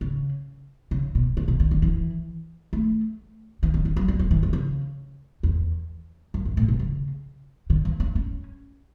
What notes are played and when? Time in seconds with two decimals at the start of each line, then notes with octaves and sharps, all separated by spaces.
0.01 C#3
0.91 C#3
1.15 B2
1.37 C#3
1.48 B2
1.60 D3
1.71 D3
1.82 E3
2.73 A3
3.63 E3
3.74 D3
3.85 E3
3.97 F#3
4.08 G3
4.19 F#3
4.31 E3
4.43 E3
4.53 C#3
5.43 E2
6.34 F#2
6.45 F#2
6.57 A2
6.68 B2
6.79 C#3
7.70 D3
7.85 E3
8.00 D4
8.15 C#4